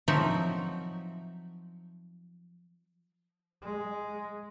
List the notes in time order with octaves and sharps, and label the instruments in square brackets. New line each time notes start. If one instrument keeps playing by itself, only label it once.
[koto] F3 F#3 C4 D#4 E5
[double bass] G#3